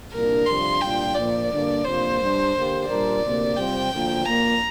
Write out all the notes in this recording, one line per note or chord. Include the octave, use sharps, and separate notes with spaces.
C2 A#2 A#3 D4 A#4
F2 C3 G3 D4 F4 C6
C2 A#2 G3 D4 F4 G5
A#1 A#2 F3 A#3 D5
G2 D3 A#3 D4
F2 C3 A#3 D4 F4 C5
G2 G3 D4
D3 A#3 G4
A#2 G3 D4 A#4 D5
D2 C3 A#3
C3 G3 C4 F4 C5 G5
D2 D3 F3 A#3 F4
A#1 A#2 A#3 A#5